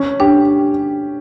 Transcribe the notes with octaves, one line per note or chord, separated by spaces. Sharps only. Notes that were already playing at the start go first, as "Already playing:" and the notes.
Already playing: C#4
D4 G4